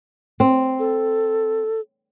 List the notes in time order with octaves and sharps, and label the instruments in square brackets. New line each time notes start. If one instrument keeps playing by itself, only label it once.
[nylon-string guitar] C4
[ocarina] A4